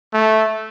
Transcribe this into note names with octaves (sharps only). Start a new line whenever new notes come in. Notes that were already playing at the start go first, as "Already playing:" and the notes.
A3